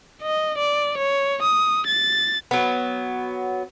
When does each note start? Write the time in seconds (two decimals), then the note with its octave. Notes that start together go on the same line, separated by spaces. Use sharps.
0.23 D#5
0.58 D5
0.98 C#5
1.43 D#6
1.88 A6
2.51 F#3 B3